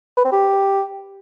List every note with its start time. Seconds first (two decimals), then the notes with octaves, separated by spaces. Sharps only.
0.17 B4
0.25 C4
0.32 G4